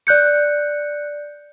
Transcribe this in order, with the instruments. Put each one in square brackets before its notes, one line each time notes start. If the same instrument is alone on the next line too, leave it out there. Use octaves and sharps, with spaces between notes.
[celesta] D5 F#6 G6 C#7